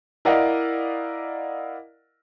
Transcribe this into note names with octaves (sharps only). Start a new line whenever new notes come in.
E4 A#4 D5 D#5 F5 F#5